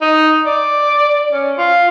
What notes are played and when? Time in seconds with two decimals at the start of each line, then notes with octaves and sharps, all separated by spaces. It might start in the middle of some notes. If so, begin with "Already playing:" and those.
0.01 D#4
0.46 D5
1.31 C#4
1.58 F4